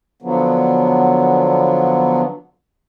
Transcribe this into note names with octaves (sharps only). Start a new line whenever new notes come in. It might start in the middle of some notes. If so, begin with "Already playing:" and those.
D3 F3 F#3 B3